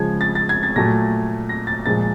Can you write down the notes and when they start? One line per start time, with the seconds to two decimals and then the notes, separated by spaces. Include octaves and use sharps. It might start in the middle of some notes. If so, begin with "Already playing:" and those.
Already playing: C#3 F3 G#3 G#6
0.21 A6
0.35 A6
0.49 G#6
0.63 A6
0.76 A#2 F#3 A3 A#6
1.49 A#6
1.67 A6
1.86 A#2 F3 G#3 A6